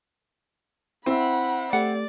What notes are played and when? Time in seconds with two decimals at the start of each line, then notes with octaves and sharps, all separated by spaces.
1.06 C4 E4 E5 F#5 B5
1.73 A3 G4 D5 F#5